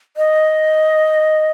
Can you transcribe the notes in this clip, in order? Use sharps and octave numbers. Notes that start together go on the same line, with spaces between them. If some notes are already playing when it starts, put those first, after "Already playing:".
D#5